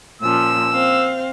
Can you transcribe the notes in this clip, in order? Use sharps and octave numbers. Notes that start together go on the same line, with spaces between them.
A#2 F3 C#4 E6
C4 F5